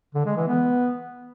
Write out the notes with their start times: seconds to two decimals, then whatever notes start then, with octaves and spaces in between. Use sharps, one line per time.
0.14 D3
0.25 G#3
0.36 E3
0.47 B3